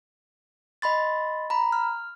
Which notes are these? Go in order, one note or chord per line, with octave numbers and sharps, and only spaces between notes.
D#5 B5 C6 A6
A#5 B5
F6